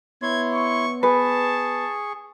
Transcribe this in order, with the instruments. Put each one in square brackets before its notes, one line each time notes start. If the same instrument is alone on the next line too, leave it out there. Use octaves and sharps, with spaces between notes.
[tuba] B3 [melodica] E4 C#5 C6 [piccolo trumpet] G#6
[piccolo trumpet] C#6
[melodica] G#4 C#6 [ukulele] B4 [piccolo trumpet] A5